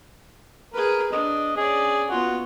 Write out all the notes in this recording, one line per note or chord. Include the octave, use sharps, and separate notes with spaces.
G#4 A#4 B4
D4 D#5
C#4 G#4 D5
B3 F4 F#4